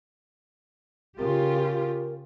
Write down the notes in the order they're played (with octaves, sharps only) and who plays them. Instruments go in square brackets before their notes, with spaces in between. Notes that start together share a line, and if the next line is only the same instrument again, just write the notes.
[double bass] C#3 [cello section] F4 G4 [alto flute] A#4